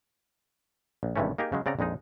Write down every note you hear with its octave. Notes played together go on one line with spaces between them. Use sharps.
A#1
G#1 G2 C3 E3 A3 C#4
A#3 D#4 G4 G#4 A#4
C#3 F#3 G#3
C#3 C4 D5 F#5 A#5
A#1 F2 G#3 D#4